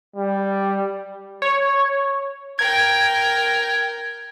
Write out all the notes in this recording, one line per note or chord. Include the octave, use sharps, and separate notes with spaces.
G3
C#5
A#4 G5 G#6